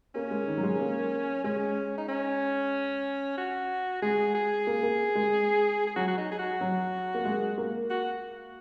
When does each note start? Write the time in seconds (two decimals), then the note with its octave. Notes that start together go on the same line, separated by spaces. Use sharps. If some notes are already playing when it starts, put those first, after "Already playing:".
0.15 A#3 C#4
0.31 G#3
0.47 D#3
0.57 F#3
0.63 G#3
0.79 A#3
1.44 G#3 C#4
1.98 D#4
2.09 C#4
3.38 F#4
4.02 G#3 G#4
4.35 G#4
4.67 A#3
4.83 A#3
5.15 G#3
5.87 G#4
5.96 F#3 F#4
6.08 F#4
6.18 D#4
6.32 G#4
6.39 F#4
6.61 F#3
7.14 A#3
7.25 G#3
7.58 A#3
7.90 F#4